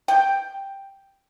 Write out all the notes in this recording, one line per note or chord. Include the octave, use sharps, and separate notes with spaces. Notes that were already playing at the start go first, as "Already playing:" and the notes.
G5